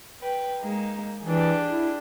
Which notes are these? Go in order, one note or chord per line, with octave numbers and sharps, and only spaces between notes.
B4 G5
G#3 A#3 D#4
E3 D4 G4 G#4
E4